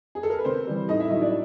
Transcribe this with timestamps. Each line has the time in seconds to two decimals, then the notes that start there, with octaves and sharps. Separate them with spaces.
0.15 G#4
0.23 A4
0.30 A#4
0.38 B4
0.45 C3 C4 C5
0.67 E3 G3
0.88 A2 D#4 D#5
1.00 E4 E5
1.10 F#3 D#4 D#5
1.21 D4 D5